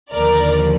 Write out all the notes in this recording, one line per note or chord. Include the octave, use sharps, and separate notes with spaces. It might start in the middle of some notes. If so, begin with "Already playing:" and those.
D#2 D3 F3 A#4 D5